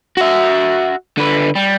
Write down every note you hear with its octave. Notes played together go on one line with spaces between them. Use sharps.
F#4 E5
D3 B4
G3